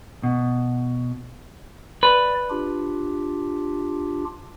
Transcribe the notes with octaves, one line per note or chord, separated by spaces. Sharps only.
B2
B4 D5
D4 F4 G4